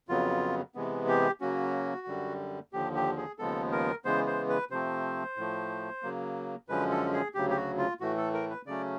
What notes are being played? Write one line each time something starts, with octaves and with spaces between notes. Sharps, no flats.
F2 C#3 F#3 B3 F4
C3 E3 G#3 B3
G4
C#3 F#3 A#3 C#4 F#4
F#2 D3 G3
D#2 D3 F3 G4
G4
G#4
D#2 C#3 F3 G#3 B3 A4
A#4
C#3 E3 G#3 B3 C5
C5
B4
C3 F3 A3 C4 C5
A2 F3 A3
C#3 F#3 A#3
F#2 D3 F3 G#3 C#4 B4
A4
G#4
D2 C#3 F#3 G4
G4
F#4
F4
A2 E3 A3 F#4
A4
A#4
B4
C#3 F#3 A3 C#4 D5